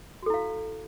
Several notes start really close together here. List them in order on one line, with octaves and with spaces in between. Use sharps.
F#4 A4 E4 F5